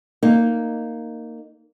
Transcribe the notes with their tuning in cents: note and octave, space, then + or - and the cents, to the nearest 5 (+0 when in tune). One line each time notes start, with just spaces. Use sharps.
A#3 -10 D#4 -5